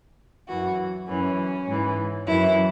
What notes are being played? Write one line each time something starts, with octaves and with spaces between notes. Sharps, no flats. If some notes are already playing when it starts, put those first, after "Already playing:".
F#2 E3 F#4
F#2 E3 C#4
G#2 E3
F#2 E3 E4